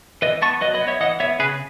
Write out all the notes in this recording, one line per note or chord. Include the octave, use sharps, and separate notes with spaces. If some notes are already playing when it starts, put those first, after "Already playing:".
E3 B4 D#5
B3 A5 C#6
F#3 B4 D#5
B4 D#5
B3
C#5 E5
E3 D#5 F#5
B3 C#5 E5
C#3 G#4 B4